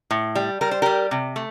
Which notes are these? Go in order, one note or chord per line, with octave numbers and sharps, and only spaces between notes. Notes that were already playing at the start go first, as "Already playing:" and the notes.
A2
G3
G3 A#4
C5
G3 G4 A#4
C3
A3